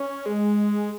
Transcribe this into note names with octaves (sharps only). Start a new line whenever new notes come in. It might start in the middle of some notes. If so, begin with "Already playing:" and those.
Already playing: C#4
G#3